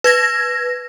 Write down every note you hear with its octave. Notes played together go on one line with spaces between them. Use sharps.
B4 G#6 A#6